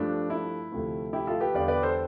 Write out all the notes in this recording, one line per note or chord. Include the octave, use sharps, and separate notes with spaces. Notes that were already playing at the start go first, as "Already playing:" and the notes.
Already playing: G2 F3 A3 D4
E4
D2 C3 F3 A3
E4 G4
F4 A4
G4 B4
E2 D3 G3 D5 F5
B4 D5
A4 C5